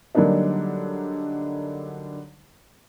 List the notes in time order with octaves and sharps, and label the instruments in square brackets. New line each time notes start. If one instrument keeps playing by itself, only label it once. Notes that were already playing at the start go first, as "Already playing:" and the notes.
[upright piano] D3 F#3 G3 A#3 D4 D#4